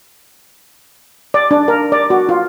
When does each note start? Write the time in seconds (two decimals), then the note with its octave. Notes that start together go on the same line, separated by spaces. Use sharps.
1.34 D5
1.51 D4
1.68 A#4
1.92 D5
2.10 F#4
2.29 F4